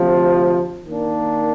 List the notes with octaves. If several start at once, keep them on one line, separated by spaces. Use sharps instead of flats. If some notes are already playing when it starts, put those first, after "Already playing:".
Already playing: D2 C3 F3
D#3 A#3 D4